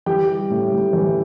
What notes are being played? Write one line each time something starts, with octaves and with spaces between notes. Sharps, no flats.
E3 G4 G5
G3
A2
A2
E3